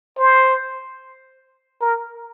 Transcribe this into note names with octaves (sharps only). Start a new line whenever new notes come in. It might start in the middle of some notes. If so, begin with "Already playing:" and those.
C5
A#4